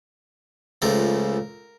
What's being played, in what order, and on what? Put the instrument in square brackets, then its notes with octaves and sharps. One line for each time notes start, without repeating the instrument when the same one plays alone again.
[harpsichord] C#2 C#3 F3 A3 A#4